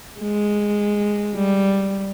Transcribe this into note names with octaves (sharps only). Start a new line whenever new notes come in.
G#3
G3